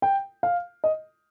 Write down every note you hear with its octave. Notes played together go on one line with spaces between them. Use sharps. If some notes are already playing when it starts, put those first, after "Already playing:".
G5
F5
D#5